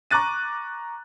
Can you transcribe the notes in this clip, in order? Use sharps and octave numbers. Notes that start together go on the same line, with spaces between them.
A#5 C#6 D6 F#6 A6 D#7